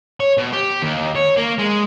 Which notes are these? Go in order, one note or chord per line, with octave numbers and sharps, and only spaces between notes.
C#5
B2
G4
D#2
C#5
A#3
G#3